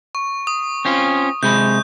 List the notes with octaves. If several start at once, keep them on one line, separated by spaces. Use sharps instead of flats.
C#6
D#6
C4 C#4 F4
C3 G#3 B5 G6